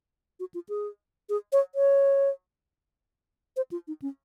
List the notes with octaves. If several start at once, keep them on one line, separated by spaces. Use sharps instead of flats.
F#4
F4
G#4
G#4
C#5
C#5
C5
F4
D#4
C#4